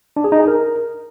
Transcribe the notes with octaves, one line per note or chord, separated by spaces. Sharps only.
D4
G#4
D#4
G#4
A#4